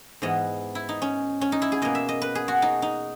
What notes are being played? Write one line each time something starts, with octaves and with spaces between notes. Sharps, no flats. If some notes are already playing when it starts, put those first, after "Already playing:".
G#2 E3 B3 D#5
E4
D#4
C#4
C#4
D#4
E4
G#4
B2 A#3 D#5
E5
D#5
B4
G#4
F#4
D#4
D#4